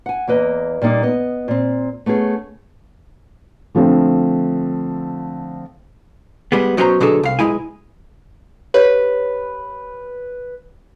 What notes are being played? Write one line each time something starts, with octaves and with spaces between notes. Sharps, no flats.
F#5 G#5
E2 A#3 B4 D#5
A#2 G3 A#3 D#4
B3 D#5
A#2 C4
A3 B3 C#4 G#4
D3 F3 A3 C4
G3 G#3 B3
B2 F#3 C4 C#4 C5 A#5
B2 D3 F#3 D4 G#4 A4
C2 F5
B1 D#3 G#3 E4 G#5
G4 B4 C#5 F5